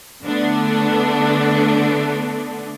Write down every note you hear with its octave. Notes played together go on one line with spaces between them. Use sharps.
D3 A3 B3 D4